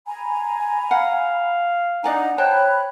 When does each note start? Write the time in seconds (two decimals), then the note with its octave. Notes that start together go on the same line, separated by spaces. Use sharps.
0.07 G#5 A#5 B5
0.91 F5 F#5
2.04 D4 D#4 D5 F#5 G#5 A#5
2.38 C5 C#5 G5 A5 B5 F#6